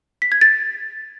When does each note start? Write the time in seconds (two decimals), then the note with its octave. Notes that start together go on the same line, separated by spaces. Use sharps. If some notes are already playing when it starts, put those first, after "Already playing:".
0.22 B6
0.32 G#6
0.41 A6